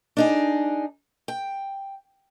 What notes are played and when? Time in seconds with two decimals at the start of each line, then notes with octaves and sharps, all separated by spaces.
0.17 D4 D#4 G#4
1.28 G5